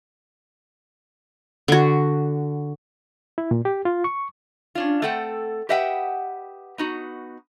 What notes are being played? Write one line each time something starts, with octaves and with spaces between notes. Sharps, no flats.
D3 F#4
E4
A#2
G4
F4
C#6
C#4 D4 F4
A3 C4 A4 F#5 G5
G4 B4 D#5 E5 F#5 G5
B3 D#4 F#4